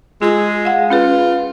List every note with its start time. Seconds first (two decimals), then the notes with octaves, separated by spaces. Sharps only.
0.22 G#3 F4 G#6
0.65 F5 F#5
0.90 C#4 F4 G#4 B4